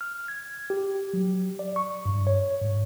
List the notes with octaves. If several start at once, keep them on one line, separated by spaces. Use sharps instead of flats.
F6
G#6
G4
F#3
D5
C#6
G2
C#5
G#2